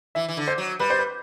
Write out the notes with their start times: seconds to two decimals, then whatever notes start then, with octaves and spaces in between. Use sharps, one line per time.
0.15 E3 E5
0.29 E3
0.37 D3
0.48 C5
0.58 F#3
0.79 G3 B4
0.90 C5
0.99 B4